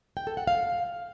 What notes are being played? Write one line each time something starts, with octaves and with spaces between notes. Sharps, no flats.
G5
A4
F#5
F5